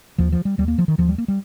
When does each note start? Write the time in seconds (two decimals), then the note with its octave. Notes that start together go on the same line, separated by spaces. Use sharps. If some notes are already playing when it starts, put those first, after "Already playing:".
0.18 D#2 F3
0.32 F3
0.45 G3
0.58 D#2 G3
0.68 A#3
0.78 F3
0.88 D#3
0.98 D#2 F3
1.09 G3
1.18 A#3
1.28 G3